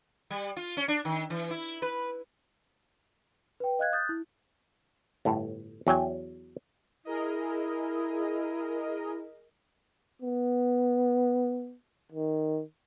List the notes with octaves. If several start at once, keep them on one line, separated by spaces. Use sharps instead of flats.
G3
F4
C#4
D4
D#3
E3
E4
B4
B4 G5
D#5 F5 F#6 G#6
D#6 F#6 G6 A6
E4
G1 A2
E2 F#3 G5 G#5
E4 G#4 A#4 D#5
B3
D#3